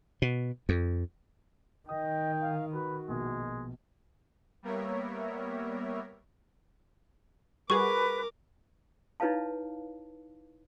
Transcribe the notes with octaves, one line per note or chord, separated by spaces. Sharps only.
B2
F2
D#3 D#5 G5 D#6
F5
F#4 B4
A#1 B2 G#3
G3 A#3 B3 A#4 C#5 E5
G3 F#4 G#4 A#4 B4 C#6 D6
D#4 E4 B4 C#5 F5 A5